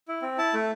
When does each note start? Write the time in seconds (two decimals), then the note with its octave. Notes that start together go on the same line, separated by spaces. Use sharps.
0.08 E4
0.22 C4
0.38 E4 A5
0.54 A3